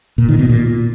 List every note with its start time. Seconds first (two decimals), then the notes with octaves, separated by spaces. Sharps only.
0.18 A#2
0.29 D#3
0.39 B2
0.49 A#2